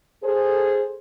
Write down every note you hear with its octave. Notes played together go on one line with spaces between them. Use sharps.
G#4 A4 C5